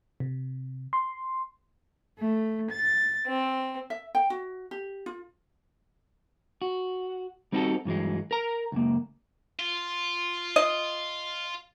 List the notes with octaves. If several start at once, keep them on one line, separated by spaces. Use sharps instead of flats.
C3
C6
A3
A6
C4
E5
G5
F#4
G4
F4
F#4
G3 C4 D#4 E4 F#4 A4
G2 E3 F#3 G#3
A#4 A#5
C#2 F#2 A#3
F4
D#5